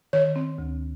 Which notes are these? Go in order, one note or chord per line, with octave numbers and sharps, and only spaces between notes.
D#3 C#5
C4
D2